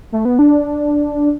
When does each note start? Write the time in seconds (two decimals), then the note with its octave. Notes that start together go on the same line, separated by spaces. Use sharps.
0.12 A3
0.25 B3
0.39 D4